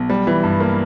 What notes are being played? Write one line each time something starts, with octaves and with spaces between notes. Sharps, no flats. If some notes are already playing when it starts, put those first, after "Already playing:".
Already playing: B1
G3
E3
G2
A#3